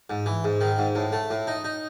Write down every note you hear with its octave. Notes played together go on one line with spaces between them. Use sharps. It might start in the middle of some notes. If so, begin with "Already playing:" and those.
G#2
E3
G#2
D#3
G#2
A2
A3
A2
D#4
D#4